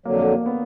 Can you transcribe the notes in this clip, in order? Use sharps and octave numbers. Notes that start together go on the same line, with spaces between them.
F2 D3 F#3 A#3
A#3
A#3
B3